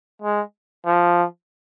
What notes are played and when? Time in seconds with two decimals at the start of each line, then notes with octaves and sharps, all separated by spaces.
0.22 G#3
0.86 F3